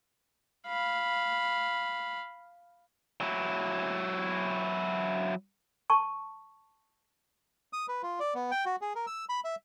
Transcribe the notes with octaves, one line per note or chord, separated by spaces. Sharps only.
F5 B5
F#3 E4
A5 C#6
D#6
B4
F4
D5
B3
G5
F#4
G#4
A#4
E6
B5
E5